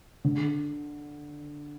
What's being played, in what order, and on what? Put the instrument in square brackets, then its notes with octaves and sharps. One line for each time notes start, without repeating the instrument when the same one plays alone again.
[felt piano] D3